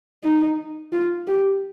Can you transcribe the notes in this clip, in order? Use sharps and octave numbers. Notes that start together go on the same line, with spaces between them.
D#4
F4
G4